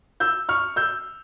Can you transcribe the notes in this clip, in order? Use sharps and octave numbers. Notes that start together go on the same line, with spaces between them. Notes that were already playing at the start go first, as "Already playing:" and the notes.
E6 G6
C#6 F6
E6 G6